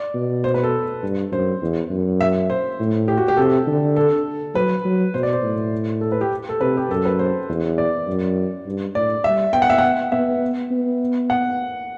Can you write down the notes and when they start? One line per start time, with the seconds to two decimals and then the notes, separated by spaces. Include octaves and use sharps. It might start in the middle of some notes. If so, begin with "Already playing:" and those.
Already playing: D5
0.14 B2
0.44 C5
0.54 B4
0.63 A4
1.03 G2
1.32 F#2 C5
1.62 E2
1.90 F#2
2.21 E5
2.50 C5
2.79 A2
3.08 G4
3.17 F#4
3.28 G4
3.37 C3 A4
3.67 D3
3.96 A4
4.55 F#3 B4
4.85 F#3
5.14 B2 C5
5.23 D5
5.32 C5
5.43 A2
6.01 A4
6.12 B4
6.21 G4
6.49 A4
6.61 C3 B4
6.77 G4
6.90 F#2 A4
7.05 B4
7.19 C5
7.49 E2
7.78 D5
8.07 F#2
8.66 G2
8.95 A2 D5
9.24 G3 E5
9.53 B3 G5
9.62 F#5
9.70 E5
9.78 F#5
10.12 B3 E5
10.71 B3
11.30 F#5